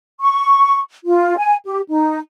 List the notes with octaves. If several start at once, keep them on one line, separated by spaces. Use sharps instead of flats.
C#6
F4
G#5
G4
D#4